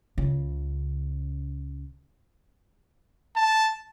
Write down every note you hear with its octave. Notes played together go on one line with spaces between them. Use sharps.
C#2 C#3
A5